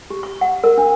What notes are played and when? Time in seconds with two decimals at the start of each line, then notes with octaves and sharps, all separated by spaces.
0.10 G4
0.23 C#6
0.41 F#5
0.64 A#4
0.78 D4